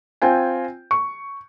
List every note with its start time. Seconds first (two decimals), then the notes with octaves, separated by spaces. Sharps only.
0.22 C4 F4 G5 G#5
0.91 C#6